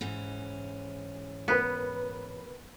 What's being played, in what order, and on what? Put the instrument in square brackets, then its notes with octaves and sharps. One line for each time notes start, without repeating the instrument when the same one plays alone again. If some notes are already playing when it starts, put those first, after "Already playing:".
[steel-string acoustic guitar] G#2 E3 C#4
[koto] B3 [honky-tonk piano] A#4 B4